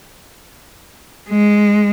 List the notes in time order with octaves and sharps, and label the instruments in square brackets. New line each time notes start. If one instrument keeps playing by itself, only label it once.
[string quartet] G#3